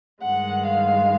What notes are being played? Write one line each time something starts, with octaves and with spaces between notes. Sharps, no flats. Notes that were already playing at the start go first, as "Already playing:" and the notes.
G2 D#3 G#3 F#5
F5